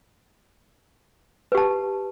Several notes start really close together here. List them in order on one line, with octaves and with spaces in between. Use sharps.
B4 G4 A5